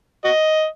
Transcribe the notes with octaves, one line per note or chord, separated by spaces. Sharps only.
F#4 D#5